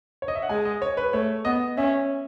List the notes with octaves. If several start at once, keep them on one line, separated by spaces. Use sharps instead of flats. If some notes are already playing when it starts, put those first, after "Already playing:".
C#5
D#5
E5
F#5
G#3 G#5
D#5
C#5
B4
A3 C#5
B3 D#5
C#4 E5